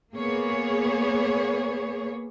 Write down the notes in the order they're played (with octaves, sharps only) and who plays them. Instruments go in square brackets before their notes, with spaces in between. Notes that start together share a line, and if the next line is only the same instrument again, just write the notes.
[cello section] A#3 B3 G#4 C#5